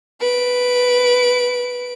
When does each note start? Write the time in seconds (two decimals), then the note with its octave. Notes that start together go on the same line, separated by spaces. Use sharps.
0.21 B4 D7